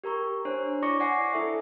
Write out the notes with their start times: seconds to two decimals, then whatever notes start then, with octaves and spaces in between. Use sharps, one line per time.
0.04 G4 A#4 A#5 C#6
0.45 D4 C5 C#5
0.82 E4 D5 C#6 D6 A#6 C#7
1.00 D5 F#5 G#5 A#6 C7
1.33 E4 A4 E5